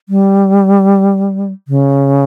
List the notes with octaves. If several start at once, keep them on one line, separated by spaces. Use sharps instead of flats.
G3
C#3